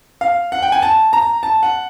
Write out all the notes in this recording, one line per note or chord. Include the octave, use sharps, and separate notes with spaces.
F5
F#5
G5
G#5
A5
A#5
A5
F#5